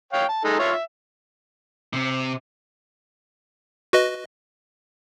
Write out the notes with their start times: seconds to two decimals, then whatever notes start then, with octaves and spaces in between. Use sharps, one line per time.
0.13 C#5 F5 G5
0.29 A5
0.44 G#3 D#4 A4
0.59 F4 C#5 E5
0.72 E5
1.93 C3
3.93 F#4 B4 D#5